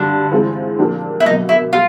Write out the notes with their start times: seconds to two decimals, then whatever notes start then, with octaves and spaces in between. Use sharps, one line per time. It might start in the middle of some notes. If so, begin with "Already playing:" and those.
Already playing: G2 D3 G3 D4
0.31 E3 G#3 C4 F4
0.78 A#2 F3 A#3 D4 G4
1.20 E4
1.25 B2 F#3 A#3 D#4
1.49 E4
1.72 G3 F4